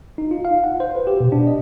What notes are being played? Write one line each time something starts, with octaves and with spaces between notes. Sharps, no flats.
D#4
F4
F5
F#5
C5
B4
G4
B2
D4
D#5